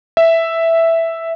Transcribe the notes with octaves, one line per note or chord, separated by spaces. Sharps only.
E5